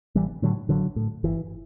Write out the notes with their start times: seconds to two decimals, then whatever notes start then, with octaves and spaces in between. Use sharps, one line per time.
0.15 A1 E3 G3
0.42 A2 D3 F#3
0.69 A1 D3 F#3
0.96 A2
1.24 G1 E3